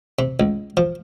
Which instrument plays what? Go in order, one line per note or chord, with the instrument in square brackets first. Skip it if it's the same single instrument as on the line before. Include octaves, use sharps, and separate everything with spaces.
[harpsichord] C3
C#2
F3